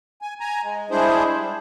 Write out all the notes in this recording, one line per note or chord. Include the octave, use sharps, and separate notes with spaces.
G#5
G#5 A#5
G#3
G3 G#3 D4 E4 G#4 C5
G3